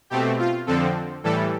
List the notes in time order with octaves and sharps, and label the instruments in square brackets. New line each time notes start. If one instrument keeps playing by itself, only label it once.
[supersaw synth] B2 A3 C4 G4
F4
F2 D3 F3 C4 A4
A2 E3 G3 A4